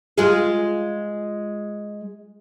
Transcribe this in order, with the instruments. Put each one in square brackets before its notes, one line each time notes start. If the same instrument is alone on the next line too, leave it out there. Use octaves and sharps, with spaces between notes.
[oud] G#3 F4 G#4